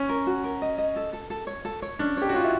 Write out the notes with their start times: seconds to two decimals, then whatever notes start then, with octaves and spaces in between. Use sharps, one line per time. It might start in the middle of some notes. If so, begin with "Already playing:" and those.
Already playing: C#4
0.09 A#4
0.27 F#4
0.44 A#4
0.62 D#5
0.78 D#5
0.96 A4
1.13 A4
1.30 A4
1.47 C#5
1.65 A4
1.82 C#5
1.99 C#4 D4
2.17 G4 C#5
2.29 F#4
2.34 F4 C#5
2.44 E4